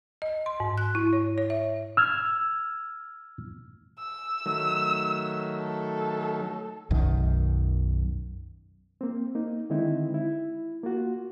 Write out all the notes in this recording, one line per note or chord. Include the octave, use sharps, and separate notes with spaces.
D#5
C6
G#2
F#6
E4
C#5
C#5
E5
E6 F6 G#6
E6
D#3 F#3 A3
A4
B1 F#2 D#3
A#3 C4
A#3 D#4
D3 D#3 G#3 C4 D#4 E4
E4
A#3 F4 F#4